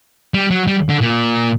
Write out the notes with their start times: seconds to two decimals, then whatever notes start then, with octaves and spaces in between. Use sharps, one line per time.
0.34 G3
0.51 F#3
0.67 G3
0.89 D3
1.01 A#2